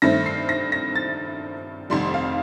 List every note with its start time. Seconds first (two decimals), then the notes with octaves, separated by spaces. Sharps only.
0.02 G2 D#3 A3 C4 A#6
0.26 C7
0.49 A#6
0.72 A#6
0.96 A6
1.90 F1 F2 D#3 G3 C6
2.14 F5